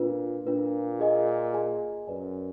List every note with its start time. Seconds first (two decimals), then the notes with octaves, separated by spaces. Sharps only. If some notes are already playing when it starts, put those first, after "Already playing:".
Already playing: A#2 D4 F4 B4
0.46 A#2 D4 F4 B4
1.00 G#4 D#5 G#5
1.54 G#4 D#5 G#5
2.07 F#2 B4 D5 G#5